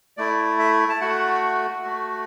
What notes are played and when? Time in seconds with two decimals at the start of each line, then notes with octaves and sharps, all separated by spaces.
0.17 A3 E4 D5
0.59 E5
0.90 A5
1.00 A3 F#4 F#5
1.83 A3 F#4